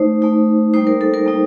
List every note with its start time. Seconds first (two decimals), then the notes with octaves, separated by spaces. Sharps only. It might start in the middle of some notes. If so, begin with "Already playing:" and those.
Already playing: A3 D#4 C5
0.22 A3 D#4
0.74 G3 A#3 D#4 C5
0.87 A#4
1.01 A4
1.14 A#4
1.26 G3 A#3 D#4